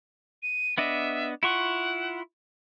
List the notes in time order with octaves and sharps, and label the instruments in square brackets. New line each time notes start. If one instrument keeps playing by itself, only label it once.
[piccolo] D#7
[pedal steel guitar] B3 D4 D#5 [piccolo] E5
[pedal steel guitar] E4 F4 C#6 [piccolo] F#5